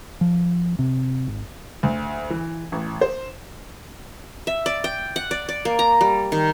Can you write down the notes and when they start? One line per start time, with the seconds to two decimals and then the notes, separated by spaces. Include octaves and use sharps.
0.21 F3
0.79 C3
1.27 G#1
1.83 D2
2.30 E3
2.72 A1
3.01 C5
4.47 E5
4.66 D5
4.84 G5
5.16 F#5
5.31 D5
5.49 D5
5.65 A#3
5.79 A#5
6.01 G3
6.32 D#3